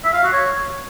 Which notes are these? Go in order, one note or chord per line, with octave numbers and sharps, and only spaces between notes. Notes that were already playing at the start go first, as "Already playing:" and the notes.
E5
F5
F#4
C#5